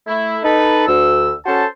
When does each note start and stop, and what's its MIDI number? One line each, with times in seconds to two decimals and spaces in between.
0.07 0.39 57
0.07 0.39 64
0.43 0.86 63
0.43 0.86 69
0.43 0.86 71
0.87 1.31 38
0.87 1.31 88
1.46 1.64 61
1.46 1.64 66
1.46 1.64 69
1.46 1.64 72
1.46 1.64 81